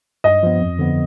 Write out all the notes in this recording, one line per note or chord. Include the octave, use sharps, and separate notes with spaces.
G2 D#5
F3 B3
F2
D3 F3 B3